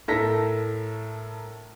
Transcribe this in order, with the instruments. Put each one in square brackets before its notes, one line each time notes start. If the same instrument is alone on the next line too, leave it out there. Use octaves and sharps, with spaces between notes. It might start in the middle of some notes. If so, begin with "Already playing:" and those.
[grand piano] A2 A4 A#4 A#6 B6